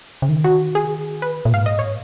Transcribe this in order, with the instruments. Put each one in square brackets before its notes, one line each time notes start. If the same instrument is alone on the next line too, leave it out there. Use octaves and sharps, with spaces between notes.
[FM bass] C#3
D#3
[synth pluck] F#4
G#4
B4
[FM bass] A#2
[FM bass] G#2 [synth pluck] F5
[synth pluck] D#5
C#5